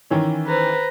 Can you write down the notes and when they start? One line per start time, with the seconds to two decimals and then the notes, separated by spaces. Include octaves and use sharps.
0.10 D#3 E3 C#4
0.46 B4 C5 A#5